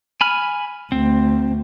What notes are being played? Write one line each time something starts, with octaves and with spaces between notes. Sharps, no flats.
G#5 B5 F6
D2 C4